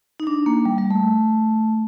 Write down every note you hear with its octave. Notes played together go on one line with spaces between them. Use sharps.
D#4
D4
A#3
G3
G3
A3